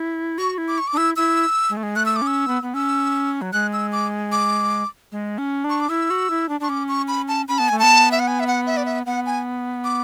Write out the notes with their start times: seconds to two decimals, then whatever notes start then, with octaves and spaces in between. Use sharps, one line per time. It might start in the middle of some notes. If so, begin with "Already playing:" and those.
Already playing: E4
0.38 F#4 C#6
0.58 E4
0.68 D6
0.78 C#6
0.87 D6
0.93 D4
0.97 E4 E6
1.16 E4 E6
1.70 G#3
1.77 A3
1.83 G#3
1.96 A3 F#6
2.06 E6
2.16 D6
2.22 C#4
2.27 E6
2.48 B3
2.62 B3
2.74 C#4 E6
3.42 F#3
3.53 G#3 F#6
3.73 E6
3.92 D6
4.32 D6
5.12 G#3
5.38 C#4
5.64 D4
5.70 C#6
5.80 D6
5.90 E4 E6
6.10 F#4
6.30 E4
6.49 D4
6.60 D4 C#6
6.69 C#4 D6
6.88 C#6
7.08 B5
7.28 A5
7.48 C#4 B5
7.58 B3 A5
7.69 A3 G#5
7.79 B3 A5
8.11 E5
8.19 F#5
8.27 G#5
8.40 E5
8.47 F#5
8.66 E5
8.77 D5
8.86 E5
9.06 B3 F#5
9.26 G#5
9.84 D6